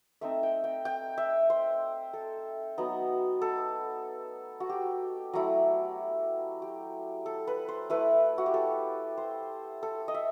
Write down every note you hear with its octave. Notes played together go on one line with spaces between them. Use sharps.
A3 C4 D#4 E5
G5
G5
G5
E5
C5
A4
F#3 B3 D#4
A4
F#4
G4
F#3 A3 E4
G4
A4
B4
C5
A3 E4 B4
F#4
G4
A4
C5
A4
D#5
E5